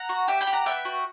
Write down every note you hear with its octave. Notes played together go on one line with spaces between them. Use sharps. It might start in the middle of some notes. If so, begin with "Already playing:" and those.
Already playing: F#5 A#5
F#4
G4 E5 G5
G5 B5
G4
F#5 A#5
B3 E5 G5
F#4